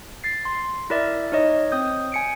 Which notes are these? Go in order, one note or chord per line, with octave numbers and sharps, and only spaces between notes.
A6 C7
C6
E4 A#4 D5 E5
D#4 C#5 D#5
C4 D#6 G6
G#5 C#7 D7